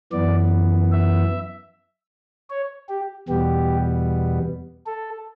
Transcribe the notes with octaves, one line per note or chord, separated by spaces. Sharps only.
F#2 E3 B3 D5
E5
C#5
G4
E2 B2 G3 B3 G4
A4